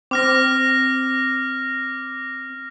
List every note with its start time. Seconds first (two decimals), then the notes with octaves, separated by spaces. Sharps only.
0.11 C4 D6 F6 A#6